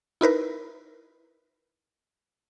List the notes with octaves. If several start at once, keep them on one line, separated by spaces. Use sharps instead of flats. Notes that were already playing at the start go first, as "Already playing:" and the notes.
D#4 E4 A#4 B4